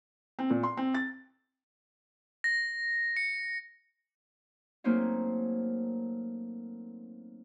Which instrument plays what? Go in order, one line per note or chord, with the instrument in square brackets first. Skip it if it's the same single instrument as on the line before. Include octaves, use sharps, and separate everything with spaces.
[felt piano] C4
A#2
C6
C4
A6
[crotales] A#6
C#7
[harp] F#3 A3 A#3 C4 C#4 D#4